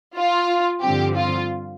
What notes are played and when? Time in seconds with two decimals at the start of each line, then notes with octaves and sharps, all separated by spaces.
0.16 F4
0.82 G2 D3 F3 C4 G4
1.16 F4